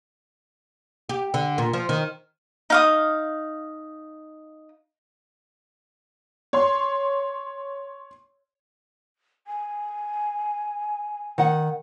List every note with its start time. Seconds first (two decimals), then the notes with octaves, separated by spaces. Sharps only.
1.09 G4
1.34 D3
1.58 A#2
1.73 F3
1.89 D#3
2.70 D#4 F5 D#6
6.53 C#5 C6
9.47 G#5
11.38 D#3 F#5